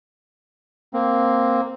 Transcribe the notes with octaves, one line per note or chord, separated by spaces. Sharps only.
A#3 C4